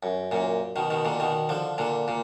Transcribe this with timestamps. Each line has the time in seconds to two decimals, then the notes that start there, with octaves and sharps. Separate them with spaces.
0.03 F#2
0.31 F#2 A#2
0.76 B2 D#3
0.90 B2 D#3
1.05 A#2 D3
1.20 B2 D#3
1.49 D3 F3
1.78 A#2 D3
2.08 A#2